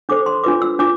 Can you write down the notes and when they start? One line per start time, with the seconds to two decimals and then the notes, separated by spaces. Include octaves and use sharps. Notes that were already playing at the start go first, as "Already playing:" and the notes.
0.09 D4 A4 C5 D6
0.26 C6
0.44 D4 F4 B4 D6
0.62 E6
0.79 D4 F4 D6